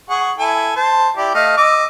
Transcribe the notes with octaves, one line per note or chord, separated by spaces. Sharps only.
G#4 F#5 C#6
E4 A4 G#5
C5 A5
E4 G4 D5
A3 D#5 F5
D#5 D6 E6